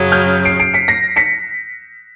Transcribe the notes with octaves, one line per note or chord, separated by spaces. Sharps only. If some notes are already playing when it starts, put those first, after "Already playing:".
Already playing: F#2 C#3 F#3
F6 G6
C7 D7
C7 D7
B6 C#7
A#6 C7
B6 C#7